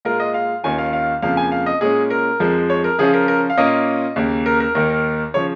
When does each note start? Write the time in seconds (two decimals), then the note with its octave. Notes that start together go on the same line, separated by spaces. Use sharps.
0.05 A#2 G#3 F4 A#4
0.20 D#5
0.34 F5
0.64 D#2 D#3 C#4 F4 G#5
0.78 F5
0.93 F5
1.22 F2 C#3 F3 A#3 F5
1.37 G#5
1.52 F5
1.66 D#5
1.81 A#2 G#3 C#4 G#4
2.10 A#4
2.40 F2 F3 G#3
2.70 C#5
2.84 A#4
2.98 C#3 F3 C#4 F4 G#4
3.14 A#4
3.28 A#4
3.50 F5
3.58 A#2 A#3 C#4 F4 D#5
4.16 D#2 C#3 A#3
4.46 A#4
4.60 A#4
4.75 D#2 D#3 A#3 A#4
4.90 A#4
5.34 C#3 F3 C#5